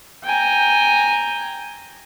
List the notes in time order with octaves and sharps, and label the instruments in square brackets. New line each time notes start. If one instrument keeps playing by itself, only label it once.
[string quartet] G5 G#5 A#5